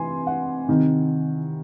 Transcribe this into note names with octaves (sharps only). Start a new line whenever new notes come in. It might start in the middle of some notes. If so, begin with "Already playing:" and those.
Already playing: C3 E3 G#5 C6
F#5
C3 D#3